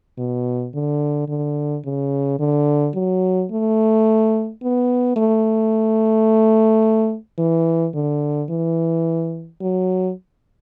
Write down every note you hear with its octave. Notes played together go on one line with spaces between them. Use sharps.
B2
D3
D3
C#3
D3
F#3
A3
B3
A3
E3
D3
E3
F#3